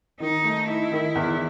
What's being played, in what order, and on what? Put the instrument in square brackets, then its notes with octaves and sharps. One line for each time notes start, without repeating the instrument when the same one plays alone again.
[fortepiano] D#3 [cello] D#4
[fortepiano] A3
[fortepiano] D#4 [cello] E4
[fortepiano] D#3
E2